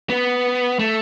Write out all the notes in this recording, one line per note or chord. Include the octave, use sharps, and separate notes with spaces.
B3
A3